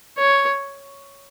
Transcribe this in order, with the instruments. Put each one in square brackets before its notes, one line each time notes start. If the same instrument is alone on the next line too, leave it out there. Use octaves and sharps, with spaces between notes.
[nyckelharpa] C#5